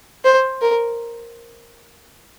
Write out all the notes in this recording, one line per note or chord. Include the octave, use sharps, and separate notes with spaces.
C5
A#4